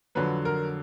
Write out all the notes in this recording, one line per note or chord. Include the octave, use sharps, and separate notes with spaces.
F2 D3 F#3 B4
A#4